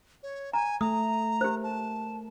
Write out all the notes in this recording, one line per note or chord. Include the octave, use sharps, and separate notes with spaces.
C#5
G#5 A#5
A3 A#5 D#6
G4 A#4 C5
A5